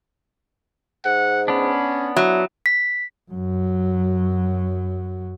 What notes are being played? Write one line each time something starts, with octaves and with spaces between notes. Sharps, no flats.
G#2 F#5
B3 C#4 D4
F#3 E4
B6
F#2 F#3